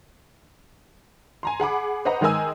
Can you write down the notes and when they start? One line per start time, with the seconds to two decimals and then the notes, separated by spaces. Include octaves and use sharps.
1.43 G#5 A#5 C6
1.60 G#4 F#5 B5 D6
2.05 B4 C5 D#5 F#5 A#5
2.21 D#3 G#3 A#4 D#5 G#5 E6